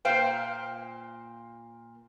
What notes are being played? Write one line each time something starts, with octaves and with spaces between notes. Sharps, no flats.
A#2 C5 F5 G5